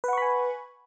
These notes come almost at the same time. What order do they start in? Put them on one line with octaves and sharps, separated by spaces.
B4 F#5 C#6 B5 G#5